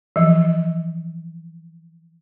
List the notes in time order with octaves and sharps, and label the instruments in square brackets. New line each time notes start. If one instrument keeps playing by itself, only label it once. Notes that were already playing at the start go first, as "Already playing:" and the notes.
[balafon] E3 F3